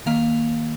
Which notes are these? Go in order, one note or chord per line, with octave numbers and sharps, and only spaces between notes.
D#3 A#3 F5